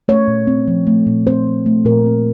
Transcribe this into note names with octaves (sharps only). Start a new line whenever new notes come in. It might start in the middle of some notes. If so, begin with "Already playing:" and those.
A3 C#5
A#2
C4
F3
A3
A#2
C4 C5
F3
A3
A#2 A#4
C4